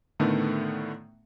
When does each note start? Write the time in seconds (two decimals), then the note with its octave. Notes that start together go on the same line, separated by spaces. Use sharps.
0.20 A2 D3 D#3 A3 B3